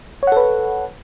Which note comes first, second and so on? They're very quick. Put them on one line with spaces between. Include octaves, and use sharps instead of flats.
C#5 F#5 A4 B4